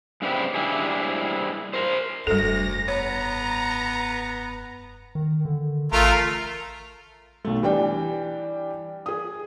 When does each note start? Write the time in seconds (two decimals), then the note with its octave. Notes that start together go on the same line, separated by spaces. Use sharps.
0.22 G2 C#3 C4 E4 G4 B4
0.55 G3 D4 E4 G#4
1.74 A#4 C5
2.27 F1 D2 G2 G3 A4 A#6
2.88 B3 C#5 A#5
5.15 D#3
5.45 D3
5.92 A1 A3 F4 A#4
7.45 B1 A3
7.63 E3 G3 D4 G5
9.06 G#4 D#6